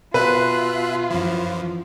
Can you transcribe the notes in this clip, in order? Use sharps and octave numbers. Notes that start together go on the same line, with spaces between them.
B2 F4 B4 E5 F#6
F#2 E3 F3